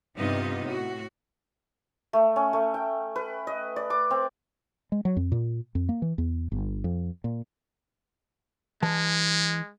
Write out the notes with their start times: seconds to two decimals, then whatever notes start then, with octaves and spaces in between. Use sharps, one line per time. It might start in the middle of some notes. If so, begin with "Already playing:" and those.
0.16 G2 C3 B3 D#4 F4 D#5
0.64 A2 F#4
2.13 A3
2.36 C#4
2.53 A3
2.74 G5
3.16 B4
3.47 D#5
3.76 D5
3.90 D6
4.11 C4
4.92 G#3
5.05 F#3
5.17 F2
5.32 A#2
5.75 F2
5.89 A#3
6.02 E3
6.18 E2
6.52 G1
6.84 F2
7.24 A#2
8.83 E3 G#3 A5